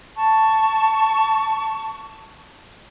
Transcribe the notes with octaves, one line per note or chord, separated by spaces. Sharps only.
A5 C#6